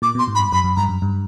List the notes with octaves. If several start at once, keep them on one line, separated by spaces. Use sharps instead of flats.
A#2 D6
B2
C6
G#2
B5
G2
F#2 B5
F#2
G2 A#5
F#2
G2